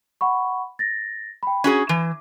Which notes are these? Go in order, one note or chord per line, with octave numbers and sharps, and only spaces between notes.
F#5 B5 C#6
A6 A#6
G5 B5
C#4 F#4 G#4 G#6
E3